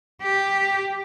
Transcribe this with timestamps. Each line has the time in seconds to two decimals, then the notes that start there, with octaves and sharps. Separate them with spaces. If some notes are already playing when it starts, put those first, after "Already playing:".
0.21 G4